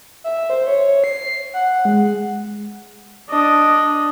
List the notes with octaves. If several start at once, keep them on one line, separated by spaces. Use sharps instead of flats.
E5
C5
C#5
C7
F#5
G#3
D4 D#5